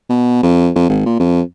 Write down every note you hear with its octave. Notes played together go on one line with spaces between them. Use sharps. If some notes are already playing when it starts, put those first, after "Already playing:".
B2
F2
F2
G#1
A#2
F2